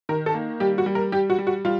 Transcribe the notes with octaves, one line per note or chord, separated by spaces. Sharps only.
D#3 A#4
A4
A#3
G3 G4
F#4
G3
A#4
G3 G4
F#4
G3
F#4
G3 F4